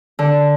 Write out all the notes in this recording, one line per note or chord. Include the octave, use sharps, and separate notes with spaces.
D3